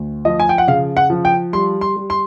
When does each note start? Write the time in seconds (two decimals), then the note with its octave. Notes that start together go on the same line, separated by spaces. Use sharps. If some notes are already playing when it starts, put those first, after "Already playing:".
Already playing: D2
0.25 F3 D#5
0.40 G#5
0.49 G5
0.58 F#5
0.68 C#3 F5
0.97 F#5
1.10 F3
1.25 G5
1.53 G3 C6
1.81 C6
1.96 G3
2.10 C6